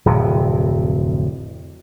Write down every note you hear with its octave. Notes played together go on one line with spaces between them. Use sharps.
D1 F2 C3